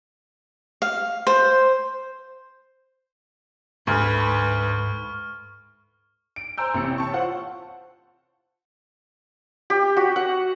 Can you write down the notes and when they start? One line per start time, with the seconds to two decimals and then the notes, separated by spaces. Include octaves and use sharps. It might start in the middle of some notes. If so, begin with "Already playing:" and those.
0.82 F5
1.27 C5
3.87 D2 G#2 B4 C#6 F6
6.36 D7
6.58 C5 G#5 A#5 E6 G6
6.74 A1 C3 C#7
6.98 C#5 A5 C#6
7.13 F4 C5 F#5
9.70 G4
9.97 F#4
10.16 F#5